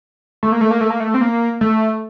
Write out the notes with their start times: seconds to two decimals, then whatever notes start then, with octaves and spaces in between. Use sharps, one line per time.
0.43 A3
0.52 A#3
0.61 A3
0.71 A#3
0.81 A3
0.90 A#3
1.00 A3
1.14 C4
1.21 A#3
1.61 A3